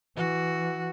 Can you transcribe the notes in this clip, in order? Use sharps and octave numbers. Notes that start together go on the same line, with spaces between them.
E3 F#4